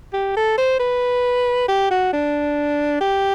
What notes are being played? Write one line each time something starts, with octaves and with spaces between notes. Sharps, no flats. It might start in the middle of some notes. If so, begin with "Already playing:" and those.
G4
A4
C5
B4
G4
F#4
D4
G4